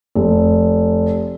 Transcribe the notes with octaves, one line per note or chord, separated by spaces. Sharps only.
F1